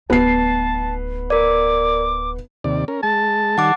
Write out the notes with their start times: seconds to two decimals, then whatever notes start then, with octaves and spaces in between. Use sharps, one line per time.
0.10 D1 B3 D#4 A5 C7
1.30 A#4 D5 D6
2.64 D#2 C3 D5
2.88 C#4 A#4
3.03 G#3 A5
3.58 D#3 G3 F#5 D6